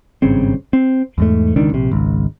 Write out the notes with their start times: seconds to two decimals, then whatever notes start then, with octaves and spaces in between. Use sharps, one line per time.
0.22 G#1 G2 C#3 C4
0.73 C4
1.18 E2 G#2 A3
1.56 E1 C#2 D#3 D4
1.72 A#1 C3
1.92 G#1 C#2